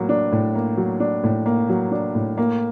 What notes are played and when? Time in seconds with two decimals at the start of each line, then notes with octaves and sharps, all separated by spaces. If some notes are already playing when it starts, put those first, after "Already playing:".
Already playing: A2 F#3 A#3
0.09 D4
0.32 A2
0.55 A#3
0.77 F#3
1.00 D4
1.24 A2
1.46 A#3
1.69 F#3
1.92 D4
2.15 A2
2.37 A#3